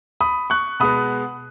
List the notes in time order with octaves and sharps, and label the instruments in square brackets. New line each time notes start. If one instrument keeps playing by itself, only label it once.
[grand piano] B5 D#6
C#6 F#6
B2 G#3 B3 B5 D#6